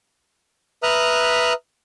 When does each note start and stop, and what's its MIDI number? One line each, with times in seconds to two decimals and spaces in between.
0.83 1.53 71
0.83 1.53 76
0.83 1.53 82
0.83 1.53 87
0.83 1.53 89
0.83 1.53 90